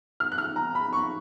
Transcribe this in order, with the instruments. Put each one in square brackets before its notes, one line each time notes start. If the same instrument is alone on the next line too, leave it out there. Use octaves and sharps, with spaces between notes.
[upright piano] F6
F#6
F6
A#5
B5
C#6